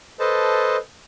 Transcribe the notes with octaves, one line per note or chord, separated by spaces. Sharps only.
A4 B4 C5 D#5 A5